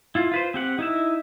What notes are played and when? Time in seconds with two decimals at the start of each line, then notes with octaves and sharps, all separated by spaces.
0.15 E4 F4
0.32 F4 B4 C5
0.54 C4 G4 F#5
0.79 D#4 E4 E5